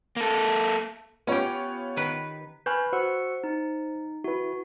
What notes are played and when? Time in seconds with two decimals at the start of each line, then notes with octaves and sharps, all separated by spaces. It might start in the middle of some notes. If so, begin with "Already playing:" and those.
0.16 A#3 A4
1.27 B3 C#4 F4 G4 C#5
1.97 D#3 B4
2.66 B4 G#5 B5 C#6 F6 G6
2.93 F#4 C5 F#5 E6
3.44 D#4
4.24 E4 F#4 B4